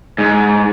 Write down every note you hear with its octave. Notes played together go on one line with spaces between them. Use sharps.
G#2